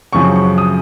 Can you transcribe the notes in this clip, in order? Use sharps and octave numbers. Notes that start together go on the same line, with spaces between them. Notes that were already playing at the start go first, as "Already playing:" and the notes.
F#2 C#3 F3 C4 C#6
C#6
D#6